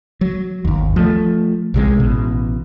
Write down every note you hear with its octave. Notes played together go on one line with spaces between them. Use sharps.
F#3
G1 D#2
F3 A3
B1 C3 G#3
A1 B2